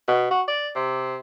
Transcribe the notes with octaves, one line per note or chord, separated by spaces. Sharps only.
B2
F#4
D5
C3